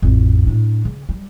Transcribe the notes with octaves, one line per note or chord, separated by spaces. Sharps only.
A1 F2
A2 D4
C#3
G3